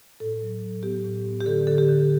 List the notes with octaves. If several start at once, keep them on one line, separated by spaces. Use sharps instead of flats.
A2 A4
F#3
A2
B3 G4
A2
B3
G4
D3 A4
D3 A4
G4
D3